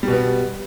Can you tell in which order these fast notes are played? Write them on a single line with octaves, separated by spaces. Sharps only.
G3 B2 B3